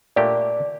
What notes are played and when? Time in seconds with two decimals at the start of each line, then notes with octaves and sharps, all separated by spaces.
0.16 A#2 A3 D4 G4 D5